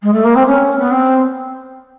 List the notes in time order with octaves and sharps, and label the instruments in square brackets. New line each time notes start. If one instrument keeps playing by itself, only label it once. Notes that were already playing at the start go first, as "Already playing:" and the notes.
[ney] G#3
A3
A#3
C4
C#4
B3
C4